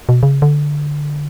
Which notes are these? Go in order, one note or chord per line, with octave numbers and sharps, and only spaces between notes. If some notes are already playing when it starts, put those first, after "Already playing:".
B2
C#3
D3